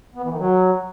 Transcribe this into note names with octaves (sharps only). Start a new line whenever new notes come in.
B3
E3
D#3
F#3